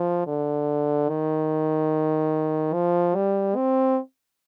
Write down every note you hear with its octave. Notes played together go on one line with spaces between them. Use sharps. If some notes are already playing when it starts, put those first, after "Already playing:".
Already playing: F3
D3
D#3
F3
G3
C4